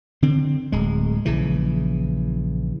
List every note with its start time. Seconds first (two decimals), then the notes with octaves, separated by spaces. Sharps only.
0.22 D3 C4
0.72 D1 G#3
1.25 A#1 C#3 E3